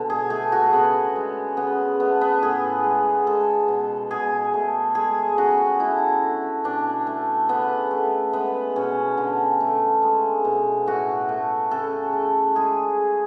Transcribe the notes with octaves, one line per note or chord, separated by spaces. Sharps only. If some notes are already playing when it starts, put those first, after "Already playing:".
Already playing: B2 D3 G#3
G#4
A3 G#4
F#4
C#3 B3
G#3
C#3 B3
A3 B3
B3
A2 G#4
G#3
G#3 A4
B2
B2 G#4
A3
G#3 G#4
C#3 F#4
A3 E4
D3
B2 D4
A3
C#3 B3
A3
G#3 B3
B2 C#4
D3
A3
G#3
B2
A2 F#4
A3
C#3 A4
A3
G#3 G#4